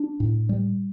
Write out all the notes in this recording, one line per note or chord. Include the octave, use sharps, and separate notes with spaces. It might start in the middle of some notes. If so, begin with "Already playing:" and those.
Already playing: D4
A2
G3